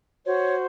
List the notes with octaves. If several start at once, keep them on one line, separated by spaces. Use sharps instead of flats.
F#4 C5 C#5